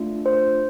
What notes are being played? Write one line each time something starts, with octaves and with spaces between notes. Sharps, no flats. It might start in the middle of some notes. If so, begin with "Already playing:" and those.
Already playing: A3 D4 F4
C5